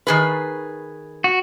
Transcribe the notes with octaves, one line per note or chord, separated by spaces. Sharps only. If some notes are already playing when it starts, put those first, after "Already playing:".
D#3 G#4 B4
F#4